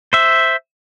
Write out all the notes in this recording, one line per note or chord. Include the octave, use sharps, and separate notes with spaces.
C5 E5